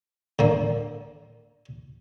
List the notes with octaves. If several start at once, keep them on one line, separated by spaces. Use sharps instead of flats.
D3 A#3